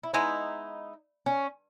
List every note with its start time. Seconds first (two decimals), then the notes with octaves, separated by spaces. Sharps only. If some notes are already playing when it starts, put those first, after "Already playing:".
0.03 E4
0.13 G#3 B3 D#4 E4
1.26 C#4